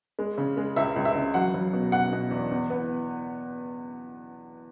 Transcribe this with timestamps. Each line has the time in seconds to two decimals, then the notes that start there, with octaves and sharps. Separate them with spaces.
0.19 G#3
0.38 C#3
0.57 G#3
0.76 C#2 E5
0.96 C#2
1.05 E5
1.15 C#3
1.34 F#3 F#5
1.54 F#3
1.73 B2
1.92 B2 F#5
2.12 B2
2.31 E2
2.51 E2
2.70 B3